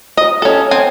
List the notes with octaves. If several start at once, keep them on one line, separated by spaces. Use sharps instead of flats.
D#5
C#4 A4
C4 G#5